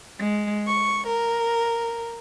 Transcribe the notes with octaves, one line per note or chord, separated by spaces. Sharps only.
G#3
C#6
A#4